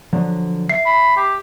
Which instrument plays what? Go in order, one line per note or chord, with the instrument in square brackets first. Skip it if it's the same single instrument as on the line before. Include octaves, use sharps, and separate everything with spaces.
[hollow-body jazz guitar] D3 F3 F#3
[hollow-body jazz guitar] E5 [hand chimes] C7
[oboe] B5
G4